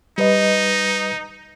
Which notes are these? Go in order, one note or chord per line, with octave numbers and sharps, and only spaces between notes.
G3 D#4 B4 D#5